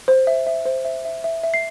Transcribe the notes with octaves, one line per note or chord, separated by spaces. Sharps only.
C5
E5
E5
C5
E5
E5
E5
E5
C7